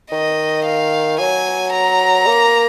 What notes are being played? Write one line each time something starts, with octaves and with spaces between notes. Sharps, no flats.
D#3 D#5
F5
F#3 G#5
A#5
A#3